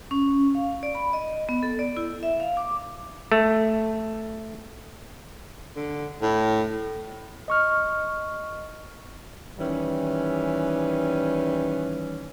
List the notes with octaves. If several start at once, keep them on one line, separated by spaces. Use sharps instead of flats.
C#4
F5
D5
B5
D#5
B3
A4
D5
E4
E5
F5
D6
A3
D3
A2
D#5 C#6 F6
D#3 E3 G3 C#4